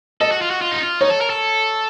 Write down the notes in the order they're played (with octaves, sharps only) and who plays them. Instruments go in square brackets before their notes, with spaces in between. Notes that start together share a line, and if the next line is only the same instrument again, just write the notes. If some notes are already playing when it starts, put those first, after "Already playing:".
[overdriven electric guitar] A4 [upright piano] D#5
[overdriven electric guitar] F#4
F4
F#4
F4
D#4
F4
[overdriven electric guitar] D#4 [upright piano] C#5
[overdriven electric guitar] A4
A#4
A4